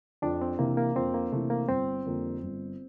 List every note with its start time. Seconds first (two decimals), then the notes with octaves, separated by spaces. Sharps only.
0.22 F2 D4
0.41 C4
0.59 C3 E3 A#3
0.77 A#3
0.95 F2 C4
1.14 A#3
1.32 C3 E3 A3
1.50 A#3
1.69 G1 C4
2.06 F2 D3 G3 A#3
2.42 G1